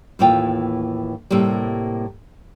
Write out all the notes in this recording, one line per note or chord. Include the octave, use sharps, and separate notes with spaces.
D#2 A2 E3 A#3 F4 G5
A2 C3 G3 A#3